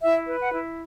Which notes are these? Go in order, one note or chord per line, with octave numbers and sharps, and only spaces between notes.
E4 E5
B4
F#5
E4